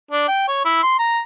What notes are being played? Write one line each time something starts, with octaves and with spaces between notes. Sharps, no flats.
D4
G5
C#5
E4
C6
A#5